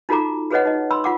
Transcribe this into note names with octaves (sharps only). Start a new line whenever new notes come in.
D#4 F4 F#4 A4 A#5 D6
F#4 G#4 B4 C#5 D#5 F#5
D#4 D#5
B5 C6 E6
F4 F#5 D6